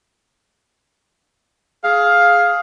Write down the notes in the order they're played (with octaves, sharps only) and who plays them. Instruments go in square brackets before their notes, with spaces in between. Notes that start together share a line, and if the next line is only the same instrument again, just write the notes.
[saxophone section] G#4 F5